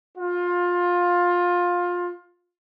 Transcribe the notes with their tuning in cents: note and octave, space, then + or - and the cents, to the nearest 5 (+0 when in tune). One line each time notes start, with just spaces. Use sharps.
F4 +20